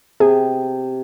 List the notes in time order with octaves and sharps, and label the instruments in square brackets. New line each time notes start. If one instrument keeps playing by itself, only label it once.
[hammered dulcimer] C3 [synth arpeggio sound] G#4